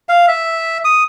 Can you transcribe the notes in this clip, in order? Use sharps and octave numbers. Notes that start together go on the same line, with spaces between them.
F5
E5
D#6